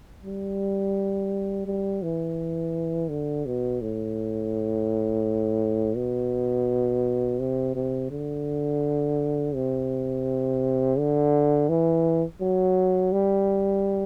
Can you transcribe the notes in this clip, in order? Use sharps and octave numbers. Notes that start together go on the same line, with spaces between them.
G3
G3
E3
D3
B2
A2
B2
C3
C3
D3
C3
D3
E3
F#3
G3